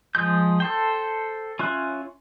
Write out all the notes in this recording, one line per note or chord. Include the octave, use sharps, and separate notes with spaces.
F3 G#3 G6
A4 C5 G5
C#4 F4 E5 F#6